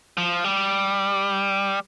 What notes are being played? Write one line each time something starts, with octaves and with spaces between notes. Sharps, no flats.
F3
G3